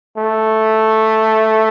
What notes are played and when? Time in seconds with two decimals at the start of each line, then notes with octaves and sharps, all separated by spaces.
0.17 A3